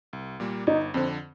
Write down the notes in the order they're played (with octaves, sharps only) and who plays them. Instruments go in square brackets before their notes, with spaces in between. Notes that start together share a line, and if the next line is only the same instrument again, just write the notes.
[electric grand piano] C2
A#2 G3 A#3
[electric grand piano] G1 [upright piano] D#4
[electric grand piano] F2 D3 [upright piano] C4